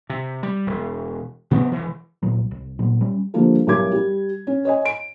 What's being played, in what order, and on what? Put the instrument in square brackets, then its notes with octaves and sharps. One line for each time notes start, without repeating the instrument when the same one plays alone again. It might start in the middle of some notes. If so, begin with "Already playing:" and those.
[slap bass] C3
G3
E1
C3 F#3 B3 C4
E1 E3
[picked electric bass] C2 A#2 F#3
C2
A#2 F#3
G3 C#4
[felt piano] D3 F3 G3 A#3 F4 A4
B1 E3 G3 A#4 D6 G#6
G3
C#4
C#5 D#5 G#5
D7